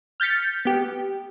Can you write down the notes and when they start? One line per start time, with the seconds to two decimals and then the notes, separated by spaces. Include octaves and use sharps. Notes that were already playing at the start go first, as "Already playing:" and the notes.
0.20 F6 G6 A6 B6 C#7
0.65 B3 G4